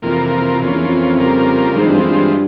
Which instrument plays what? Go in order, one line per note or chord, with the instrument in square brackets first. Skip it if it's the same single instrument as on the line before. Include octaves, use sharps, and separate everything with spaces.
[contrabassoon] F2 [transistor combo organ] C3 E3 A#3 F4 A#4
[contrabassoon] F2 [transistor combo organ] E3 A#3 C#4 F4
[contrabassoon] E2
F2
[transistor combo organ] C#3 G3 A#3 F4 A#4
[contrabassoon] G#2 [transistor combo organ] E3 G#3 C4 F4
[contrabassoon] G2
F2
G2